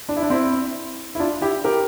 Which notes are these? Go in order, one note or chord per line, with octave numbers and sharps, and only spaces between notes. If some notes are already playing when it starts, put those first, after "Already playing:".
D4
E4
D4
C4 E4
E4
D4 F4
E4 G4
G4 A#4